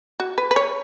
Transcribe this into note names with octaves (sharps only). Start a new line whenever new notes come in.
F#4
B4
B4
C#5